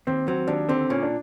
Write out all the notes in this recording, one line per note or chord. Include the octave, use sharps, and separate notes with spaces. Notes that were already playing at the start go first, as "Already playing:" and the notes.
D#2 C4
F#3 C4
D#2 D4
D3 C4
A#2 C#4
D4